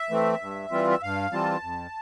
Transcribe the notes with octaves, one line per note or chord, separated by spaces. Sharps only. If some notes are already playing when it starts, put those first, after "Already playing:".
Already playing: E5
E3 A3 C4
G2
E3 G3 C4 F4
E5
G2 F5
E3 G3 C4 F4 A5
F2